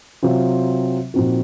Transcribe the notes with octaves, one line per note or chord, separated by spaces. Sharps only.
C3 F#3 C4 F4
A#2 F3 C4 D#4 F#4